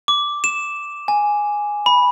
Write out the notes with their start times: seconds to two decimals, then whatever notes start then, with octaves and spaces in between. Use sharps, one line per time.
0.08 D6
0.44 E7
1.08 G#5
1.86 B5